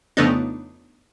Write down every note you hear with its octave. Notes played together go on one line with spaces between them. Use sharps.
F2 C#3 A3 B3 D4 D#4